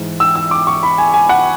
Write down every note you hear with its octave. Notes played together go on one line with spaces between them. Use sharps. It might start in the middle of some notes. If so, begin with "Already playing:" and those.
Already playing: G#2 E3
E6
E6
D6
C#6
B5
G#5
G#5
F#5